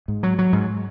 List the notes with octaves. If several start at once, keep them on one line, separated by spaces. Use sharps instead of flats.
G#2
F#3
F#3
G#2